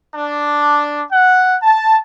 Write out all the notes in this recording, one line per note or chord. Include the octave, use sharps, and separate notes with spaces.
D4
F#5
A5